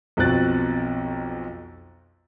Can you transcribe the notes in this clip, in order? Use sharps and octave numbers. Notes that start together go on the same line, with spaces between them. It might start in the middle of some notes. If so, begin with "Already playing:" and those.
B1 F2 B2 C4 F#6 A6